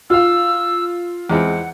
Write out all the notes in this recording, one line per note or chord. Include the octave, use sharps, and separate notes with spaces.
F4 F5 E6
E2 G#3 C4 F#5